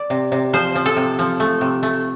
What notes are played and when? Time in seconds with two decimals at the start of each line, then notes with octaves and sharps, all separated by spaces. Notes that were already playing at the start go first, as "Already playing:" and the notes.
Already playing: D5
0.10 C3
0.32 C3
0.53 F3 C5
0.75 F3
0.86 A4
0.97 C3
1.19 F3
1.40 A3
1.61 C3
1.83 A3